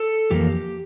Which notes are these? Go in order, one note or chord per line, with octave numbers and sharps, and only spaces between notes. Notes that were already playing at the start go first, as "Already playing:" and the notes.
Already playing: A4
F2 E3 A#3 G4